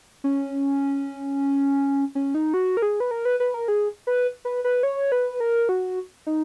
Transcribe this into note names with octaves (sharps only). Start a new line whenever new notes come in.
C#4
C#4
D#4
F#4
A#4
G#4
B4
A#4
B4
B4
A#4
G#4
B4
B4
B4
C#5
B4
A#4
F#4
D#4